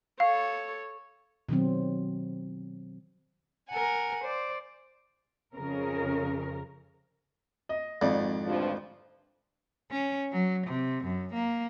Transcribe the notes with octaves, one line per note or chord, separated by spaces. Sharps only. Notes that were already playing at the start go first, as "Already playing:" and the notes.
A4 C#5 F5
B2 D#3 F#3 C4
A#4 F#5 G#5
C5 D5
F2 C#3 A#4
D#5
G#1 F2 D5
D2 G2 F3
C#4
F#3
C3
F#2
A#3